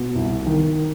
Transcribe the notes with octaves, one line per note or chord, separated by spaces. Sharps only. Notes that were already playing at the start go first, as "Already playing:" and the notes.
Already playing: B2
C2
D#3